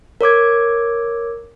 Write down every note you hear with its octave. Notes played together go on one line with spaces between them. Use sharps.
A#4 C#5 D6 G#6